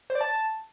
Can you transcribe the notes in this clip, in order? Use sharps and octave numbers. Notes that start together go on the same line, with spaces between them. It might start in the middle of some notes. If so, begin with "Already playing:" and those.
C5
D5
A5